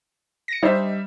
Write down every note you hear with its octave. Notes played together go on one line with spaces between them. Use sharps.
A#6 C#7
G3 D4 D#4 C5 E5